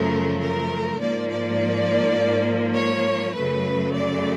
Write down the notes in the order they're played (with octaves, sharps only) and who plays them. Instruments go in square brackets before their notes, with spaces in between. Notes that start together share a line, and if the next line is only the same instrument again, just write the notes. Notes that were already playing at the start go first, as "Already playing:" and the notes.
Already playing: [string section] F#2 C#3 F3 A3 A#4
A#4
G#2 F3 A#3 D5
D5
C#5
F#2 C#3 F#3 A3 B4
D5